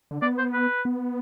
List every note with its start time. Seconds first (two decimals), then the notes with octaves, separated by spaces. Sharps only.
0.11 D3
0.22 B3 D5
0.38 C5
0.53 B4
0.85 B3